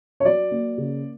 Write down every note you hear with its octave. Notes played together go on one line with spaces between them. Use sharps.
C#5
F#3 D5
A#3
C#3